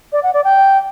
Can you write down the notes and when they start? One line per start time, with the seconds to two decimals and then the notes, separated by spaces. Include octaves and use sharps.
0.13 D5
0.23 F#5
0.34 D5
0.44 G5